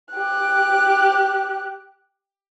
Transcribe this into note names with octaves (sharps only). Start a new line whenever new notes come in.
G4 F#6